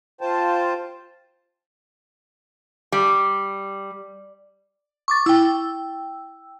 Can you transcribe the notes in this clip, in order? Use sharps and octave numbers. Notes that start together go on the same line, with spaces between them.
F4 C5 G5 A5
G3
C#6 D6 A6
E4 G5 E6